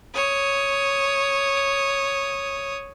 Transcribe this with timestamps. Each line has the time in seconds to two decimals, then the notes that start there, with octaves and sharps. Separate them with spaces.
0.14 C#5 D#6